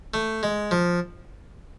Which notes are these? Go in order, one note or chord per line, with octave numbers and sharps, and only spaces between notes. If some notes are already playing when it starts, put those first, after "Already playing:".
A3
G#3
F3